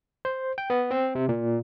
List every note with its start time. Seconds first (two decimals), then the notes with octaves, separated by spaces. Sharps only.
0.25 C5
0.58 G5
0.70 B3
0.91 C4
1.15 C3
1.29 A#2